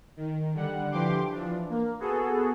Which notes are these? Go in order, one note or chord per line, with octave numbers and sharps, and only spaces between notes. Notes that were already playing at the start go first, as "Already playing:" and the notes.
D#3
D3 G3 F#5
D3 E3 F3 G4 C6 D6
E3 F3 D4
A#3
B3 F#4 G#4 A4